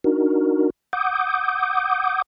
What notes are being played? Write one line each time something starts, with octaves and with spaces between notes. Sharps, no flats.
D4 D#4 F#4 A#4
F#5 D6 D#6 G6